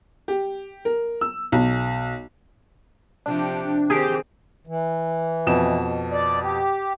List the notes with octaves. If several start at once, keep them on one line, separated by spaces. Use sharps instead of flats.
G4
A#4
E6
B1
C3 F3 D4 G4
D#3 C4 G4 G#4
E3
F2 B2 E7
D5
G4